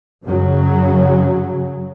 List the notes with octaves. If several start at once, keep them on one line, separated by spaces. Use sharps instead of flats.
F#2 C#3 F#3